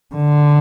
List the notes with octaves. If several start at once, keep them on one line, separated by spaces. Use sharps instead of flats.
D3